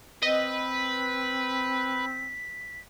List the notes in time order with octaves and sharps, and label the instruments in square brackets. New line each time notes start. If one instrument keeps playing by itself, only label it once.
[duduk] C4 [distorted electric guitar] B4 [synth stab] D#5 [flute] B6